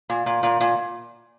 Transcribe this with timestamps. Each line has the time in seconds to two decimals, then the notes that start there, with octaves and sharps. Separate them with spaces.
0.10 A#2
0.26 A#2
0.43 A#2
0.61 A#2